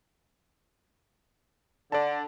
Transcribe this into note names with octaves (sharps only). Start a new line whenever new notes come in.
D3 D5 A5